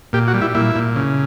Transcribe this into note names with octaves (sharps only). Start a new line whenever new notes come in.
A#2 G4
F#4
G3
E4
A#2 E4
A#2
C#3